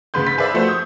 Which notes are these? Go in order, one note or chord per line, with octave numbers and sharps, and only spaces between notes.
D2 C#3 B4 C6 G6
A6 B6
G#4 B4 C5 D5 E5
F3 A3 F#4 C5 E5
C#6 D#6 G6